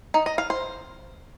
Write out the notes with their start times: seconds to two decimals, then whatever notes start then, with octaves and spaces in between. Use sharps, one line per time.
0.14 D#4
0.26 D#5
0.38 F5
0.50 C5